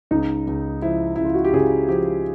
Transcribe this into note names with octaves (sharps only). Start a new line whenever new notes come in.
C#2 D#4
C#2
F3 E4
C#2 E4
F4
F#4
G4
C#3 G#4
F3 G4